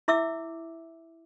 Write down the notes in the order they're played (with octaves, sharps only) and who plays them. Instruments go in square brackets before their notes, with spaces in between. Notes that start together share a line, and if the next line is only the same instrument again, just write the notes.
[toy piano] E4 E5 D6 E6